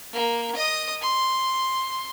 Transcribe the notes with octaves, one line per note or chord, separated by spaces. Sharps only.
A#3
D#5 D#6
C6